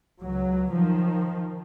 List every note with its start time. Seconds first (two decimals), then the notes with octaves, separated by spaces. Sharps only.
0.21 C#2 F#3
0.72 D#3 F3